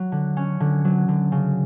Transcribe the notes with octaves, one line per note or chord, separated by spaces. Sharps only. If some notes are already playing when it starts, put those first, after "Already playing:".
Already playing: F#3
D3
C#4
D3
F#3
D3
C#3